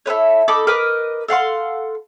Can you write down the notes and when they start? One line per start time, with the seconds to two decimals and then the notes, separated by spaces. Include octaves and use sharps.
0.06 E4 A4 B4 C#5
0.48 D#4 A4 B5 D6
0.67 A#4 B4 D#5 D6
1.28 A4 F5 F#5 C6